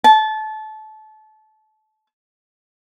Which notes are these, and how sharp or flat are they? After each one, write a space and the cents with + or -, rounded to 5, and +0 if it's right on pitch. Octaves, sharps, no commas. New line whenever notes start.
A5 -25